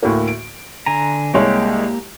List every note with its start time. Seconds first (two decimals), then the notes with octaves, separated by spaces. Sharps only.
0.03 D2 A2 A#3
0.28 D7
0.86 D3 G#5 A#5
1.34 C2 G#3 A#3 G4 C#5